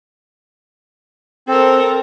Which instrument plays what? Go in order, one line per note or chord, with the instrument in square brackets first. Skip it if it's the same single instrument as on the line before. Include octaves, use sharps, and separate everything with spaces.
[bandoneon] C4 [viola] A4 A#4